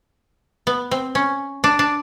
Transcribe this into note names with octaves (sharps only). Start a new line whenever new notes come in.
B3
C4
C#4
D4
D4